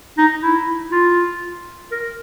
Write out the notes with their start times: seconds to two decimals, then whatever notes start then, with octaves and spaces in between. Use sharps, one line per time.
0.18 D#4
0.42 E4
0.92 F4
1.91 A#4